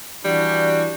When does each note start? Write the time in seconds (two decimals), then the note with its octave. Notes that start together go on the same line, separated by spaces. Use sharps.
0.25 E3 G3 D4 F#4